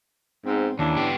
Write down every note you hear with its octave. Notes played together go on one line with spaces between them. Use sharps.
G#2 B3 C4
D#2 E3 C#4 D4 E4
B3 G4